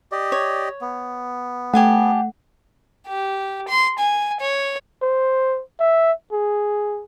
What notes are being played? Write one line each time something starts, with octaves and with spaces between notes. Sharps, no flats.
G4 D5 D#5
C#5
B3
A3 G4 F#5 G#5 A5
G4
C6
G#5
C#5
C5
E5
G#4